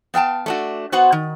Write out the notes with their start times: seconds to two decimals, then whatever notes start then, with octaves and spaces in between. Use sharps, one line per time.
0.14 B3 F5 G5 A5
0.46 A3 D4 F#4
0.92 B3 F#4 C5 F#5
1.12 D#3